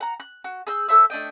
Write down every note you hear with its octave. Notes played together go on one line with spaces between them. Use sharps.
F#5 A#5
F#6
F#4
G#4 E6 G6
A4 C5 E5 E6
A3 D4 D#5 G5